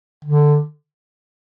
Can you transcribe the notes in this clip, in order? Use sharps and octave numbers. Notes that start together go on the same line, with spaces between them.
D3